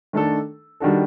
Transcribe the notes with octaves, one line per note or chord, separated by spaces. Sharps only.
D#3 A3 D4 A4
D#3 G3 D4 F#4 A4